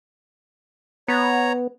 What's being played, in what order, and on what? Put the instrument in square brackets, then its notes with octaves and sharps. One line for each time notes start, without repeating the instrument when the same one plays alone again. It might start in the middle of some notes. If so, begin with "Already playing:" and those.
[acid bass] B3 [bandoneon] C#5 A#5